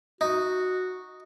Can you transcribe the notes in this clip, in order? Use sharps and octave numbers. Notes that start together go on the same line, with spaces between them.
D#4 F#4